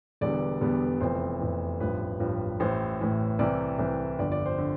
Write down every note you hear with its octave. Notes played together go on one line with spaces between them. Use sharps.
E1 E2 D3 G3 B3 D5
E1 E2 D3 G3 B3
F1 F2 E3 C5
F1 F2 E3
A1 G2 F3 B4
A1 G2 F3
A1 A2 E3 C5
A1 A2 E3
C2 C3 E3 D5
C2 C3 E3
G1 F2 D3 D5
D5
C5
D3